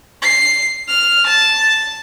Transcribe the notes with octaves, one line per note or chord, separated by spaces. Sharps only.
C7
F6
A5